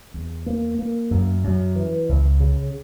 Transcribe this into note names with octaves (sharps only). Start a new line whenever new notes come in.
E2
A#3
A#3
F#2
F#2
E3
C#2
C#3